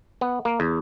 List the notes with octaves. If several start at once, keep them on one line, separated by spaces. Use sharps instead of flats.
B3
A#3
E2